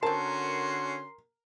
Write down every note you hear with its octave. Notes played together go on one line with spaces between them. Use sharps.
D3 C4 C#4 F#4 A#4 A5 C6